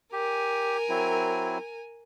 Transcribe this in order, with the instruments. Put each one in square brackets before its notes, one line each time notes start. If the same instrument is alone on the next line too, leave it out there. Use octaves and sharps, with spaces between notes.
[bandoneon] G4 [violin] A#4 G#5
[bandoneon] F#3 C4 E4